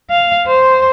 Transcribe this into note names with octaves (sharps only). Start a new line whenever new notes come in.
F5
C5